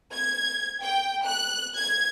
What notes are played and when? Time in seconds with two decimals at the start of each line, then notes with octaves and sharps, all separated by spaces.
0.13 G#6
0.82 G5
1.26 F#6
1.77 G#6